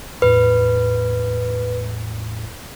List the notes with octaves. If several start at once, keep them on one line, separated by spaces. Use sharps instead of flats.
E2 A2 B4